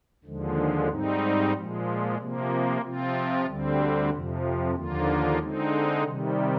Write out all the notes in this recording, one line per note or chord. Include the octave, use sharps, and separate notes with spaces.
D#2 D3 F3 G#3
G#2 G3 C4 D#4
A#2 F3 G#3
C3 F3 A#3
C3 F3 C4 F4
D2 D3 G3 C4
F2 C3 F3
D#2 D3 F3 A#3 F4
D3 G#3 C4 D#4
C3 D#3 G3